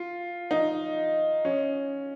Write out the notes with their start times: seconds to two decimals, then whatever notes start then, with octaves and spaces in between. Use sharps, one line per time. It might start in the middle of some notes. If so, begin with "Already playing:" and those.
Already playing: F4
0.51 D#4
1.45 C#4